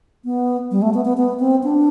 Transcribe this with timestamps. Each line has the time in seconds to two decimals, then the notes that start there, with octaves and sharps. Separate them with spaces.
0.25 B3
0.71 G3
0.82 A3
0.94 B3
1.05 B3
1.17 B3
1.40 C4
1.63 D4